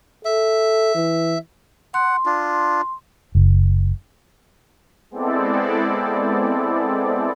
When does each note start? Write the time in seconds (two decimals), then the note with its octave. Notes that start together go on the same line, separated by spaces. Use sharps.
0.25 A4 E5
0.95 E3
1.94 F#5 C6
2.26 D4 F4
3.35 F#1
5.11 G#3 B3 C4 E4 A4 D5